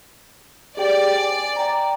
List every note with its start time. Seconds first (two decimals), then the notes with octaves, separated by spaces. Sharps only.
0.77 G4 G#4 D5 G5
1.18 G#5
1.56 G5 A#5